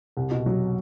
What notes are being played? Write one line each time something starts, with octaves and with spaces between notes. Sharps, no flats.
C2
B2
F#3